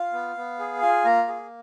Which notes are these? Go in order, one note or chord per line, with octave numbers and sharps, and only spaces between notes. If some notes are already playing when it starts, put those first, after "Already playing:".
Already playing: F4 F5
B3
B3
G#4
F4 G#5
A#3 A#5
G#4